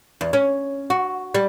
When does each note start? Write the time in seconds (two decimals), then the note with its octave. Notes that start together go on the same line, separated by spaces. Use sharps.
0.21 E2
0.33 C#4
0.90 F#4
1.34 G3